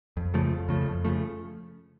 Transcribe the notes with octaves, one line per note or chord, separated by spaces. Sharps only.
F2
C#3 F3 A3
F2
C#3 F3 A3
F2
C#3 F3 A3